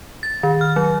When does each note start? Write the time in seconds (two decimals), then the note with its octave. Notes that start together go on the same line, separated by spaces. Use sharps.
0.23 A6
0.43 D#3
0.61 F6
0.76 F#3